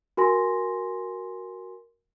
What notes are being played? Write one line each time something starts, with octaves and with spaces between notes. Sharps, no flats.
F#4 A#4 G#5 C6 A#6